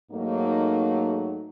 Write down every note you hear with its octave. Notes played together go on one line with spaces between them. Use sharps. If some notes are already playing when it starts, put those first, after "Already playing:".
G#2 F#3 A3 A#3 D#4